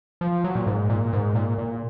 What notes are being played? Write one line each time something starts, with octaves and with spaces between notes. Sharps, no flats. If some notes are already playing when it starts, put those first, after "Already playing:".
F3
F#3
A#2
G#2
A#2
G#2
A#2
A#2